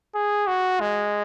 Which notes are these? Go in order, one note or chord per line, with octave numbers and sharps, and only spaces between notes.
G#4
F#4
G#3